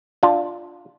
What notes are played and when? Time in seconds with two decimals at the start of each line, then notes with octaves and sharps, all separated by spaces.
0.23 D4 F4